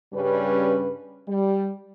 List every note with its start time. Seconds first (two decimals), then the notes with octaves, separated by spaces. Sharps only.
0.13 G2 C#3 G3 C#4 B4
1.27 G3